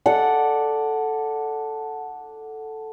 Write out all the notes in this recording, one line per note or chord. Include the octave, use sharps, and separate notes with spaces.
A4 D5 F#5